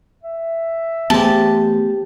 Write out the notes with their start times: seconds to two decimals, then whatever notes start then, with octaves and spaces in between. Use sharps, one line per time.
0.23 E5
1.10 E3 A3 B3 G4 G#4 C5 A5